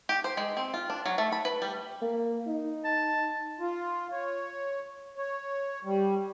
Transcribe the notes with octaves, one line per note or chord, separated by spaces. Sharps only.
G4
C5
G#3
C4
F4
D4
F#3
A3
B5
B4
G3
A#3
D#4
A5
F4
C#5
C#5
G3